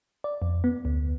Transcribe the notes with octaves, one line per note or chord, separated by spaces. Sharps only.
D5
F2
B3
D2